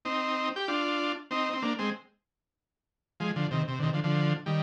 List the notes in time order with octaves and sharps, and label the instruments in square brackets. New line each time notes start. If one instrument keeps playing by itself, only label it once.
[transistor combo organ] C4 D#4
G4
D4 F4
C4 D#4
C4
A#3 D4
G#3 C4
F3 G#3
D3 F3
C3 D#3
C3
D3
C3 D#3
D3 F3
D3 F3
D#3 G3